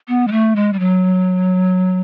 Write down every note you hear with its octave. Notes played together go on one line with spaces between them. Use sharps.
B3
G#3
A3
G#3
G3
F#3